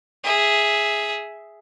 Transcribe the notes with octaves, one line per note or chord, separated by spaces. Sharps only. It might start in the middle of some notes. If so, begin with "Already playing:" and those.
G#4 E5